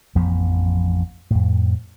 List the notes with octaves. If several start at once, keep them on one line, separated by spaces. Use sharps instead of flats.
A1 F2 F3 B3
F2 A2